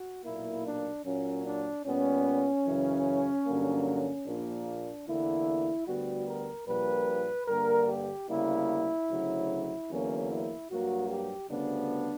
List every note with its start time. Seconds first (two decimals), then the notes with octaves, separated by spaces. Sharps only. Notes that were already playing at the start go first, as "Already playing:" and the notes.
Already playing: F#4
0.24 B1 A#2 A#3 E4
0.65 D4
1.05 A#2 F#3 A#3 C#4
1.45 D4
1.85 A#2 G3 B3 C#4
2.66 F#2 C#3 E3
3.46 G2 D3 F#3 A#3
4.26 A#1 A#2 A#3 D4
5.07 E2 D3 A#3 E4
5.87 D2 D3 G3 B3 F#4
6.27 A#4
6.67 A#1 A#2 G3 A#3 B4
7.47 G2 D3 G3 A#3 A#4
7.88 G4
8.28 D2 C#3 G3 A#3 E4
9.09 D2 C#3 F#3
9.89 E2 D3 F#3 A#3 C#4
10.29 E4
10.69 G2 F#3 A#3 F#4
11.09 G4
11.50 D2 C#3 G3 B3 D4